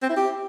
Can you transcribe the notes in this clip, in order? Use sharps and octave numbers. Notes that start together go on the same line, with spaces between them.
C4
E4
G4